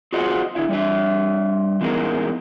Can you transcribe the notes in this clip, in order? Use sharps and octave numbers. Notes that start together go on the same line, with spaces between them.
F4 F#4 G#4 C5 D#5 F#5
D3 E4 E5
G3 D4 E5
E3 G#3 B3 C#4 D#4 A#4